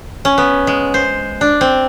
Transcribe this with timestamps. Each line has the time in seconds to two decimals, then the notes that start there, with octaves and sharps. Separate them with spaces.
0.25 C#4
0.38 B3
0.67 G#3
0.94 C5
1.41 D4
1.61 C4